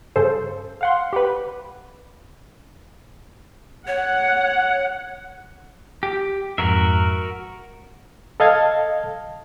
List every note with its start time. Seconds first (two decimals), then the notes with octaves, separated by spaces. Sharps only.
0.16 G2 C#3 A4 C5
0.81 F5 F#5 C6
1.13 G4 B4
3.87 C#5 F#5
6.03 G4
6.58 F2 G#2 F#4 A#4 E5
8.40 A4 D#5 F5 A5 G#6